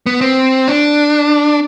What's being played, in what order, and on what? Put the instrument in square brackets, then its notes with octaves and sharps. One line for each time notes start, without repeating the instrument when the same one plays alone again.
[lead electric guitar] B3
C4
D4